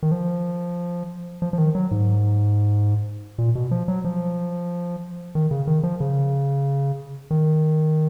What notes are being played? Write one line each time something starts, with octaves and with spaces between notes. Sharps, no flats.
D#3
F3
F3
F3
D#3
F#3
G#2
A#2
B2
F3
F#3
F3
D#3
C#3
D#3
F3
C#3
D#3